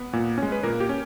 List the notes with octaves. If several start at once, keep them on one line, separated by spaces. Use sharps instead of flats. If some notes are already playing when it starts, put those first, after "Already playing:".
Already playing: B3 B4
A#2
G#3 C#4
B4
A#2 A#3 A#4
G4
C#4